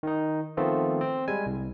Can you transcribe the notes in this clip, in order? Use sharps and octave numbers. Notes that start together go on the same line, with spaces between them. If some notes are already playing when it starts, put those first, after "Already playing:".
D#3 D#4
D#3 F3 A3 B3 C4 F4
C4
G3 G#3 G#5
C2